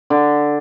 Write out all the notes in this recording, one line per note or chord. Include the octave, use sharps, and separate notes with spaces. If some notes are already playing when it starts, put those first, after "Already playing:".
D3